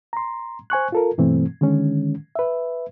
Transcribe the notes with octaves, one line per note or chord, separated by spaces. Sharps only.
A#5 C6
C5 G#5 C#6 F#6
F4 A4 A#4
G2 B2 E3 A3 C4
D3 D#3 G#3 C#4
B4 E5